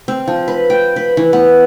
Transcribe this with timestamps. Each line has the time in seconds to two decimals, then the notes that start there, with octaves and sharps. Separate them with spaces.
0.08 C4
0.28 F3
0.48 B4
0.70 G5
0.96 B4
1.17 E3
1.33 B3